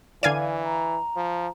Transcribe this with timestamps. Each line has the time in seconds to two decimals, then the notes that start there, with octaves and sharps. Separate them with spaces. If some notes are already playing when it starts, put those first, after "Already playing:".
0.23 D3 E3 D5 F5 G#5 G#6 D#7
0.64 A#5
1.16 F3